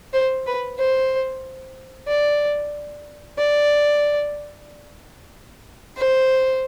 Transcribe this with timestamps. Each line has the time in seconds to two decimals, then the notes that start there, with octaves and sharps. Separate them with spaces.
0.13 C5
0.46 B4
0.79 C5
2.08 D5
3.38 D5
5.97 C5